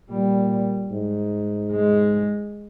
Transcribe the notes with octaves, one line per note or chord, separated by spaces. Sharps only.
A#2 G3
G#2
G#3